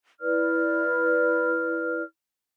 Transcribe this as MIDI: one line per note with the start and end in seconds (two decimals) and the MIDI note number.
0.21 2.02 64
0.21 2.02 71
0.21 2.02 74
0.21 2.02 89